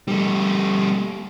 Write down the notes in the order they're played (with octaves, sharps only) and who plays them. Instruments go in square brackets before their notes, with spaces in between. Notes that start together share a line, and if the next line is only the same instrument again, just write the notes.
[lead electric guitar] G3 A3